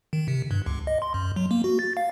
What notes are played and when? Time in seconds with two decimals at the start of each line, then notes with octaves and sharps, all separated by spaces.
0.13 D#3
0.28 C3
0.51 G2
0.66 C#2
0.87 D#5
1.02 C6
1.14 F#2
1.36 F#3
1.51 A#3
1.64 F#4
1.79 A6
1.97 F5